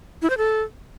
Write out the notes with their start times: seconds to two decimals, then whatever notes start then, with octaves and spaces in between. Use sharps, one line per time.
0.22 E4
0.30 C5
0.38 A4